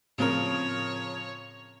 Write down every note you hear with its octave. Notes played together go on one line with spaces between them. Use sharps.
A2 C#3 F3 C4 A#4 C#5